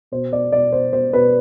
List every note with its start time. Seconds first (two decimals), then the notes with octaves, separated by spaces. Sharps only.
0.12 B2 C5
0.32 B2 D5
0.52 B2 D5
0.72 B2 C5
0.92 B2 C5
1.13 B2 B4